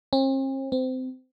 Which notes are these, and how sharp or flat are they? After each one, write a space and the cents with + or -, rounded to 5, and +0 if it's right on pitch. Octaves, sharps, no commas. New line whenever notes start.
C4 +45
C4 -25